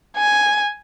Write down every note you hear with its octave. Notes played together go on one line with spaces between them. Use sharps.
G#5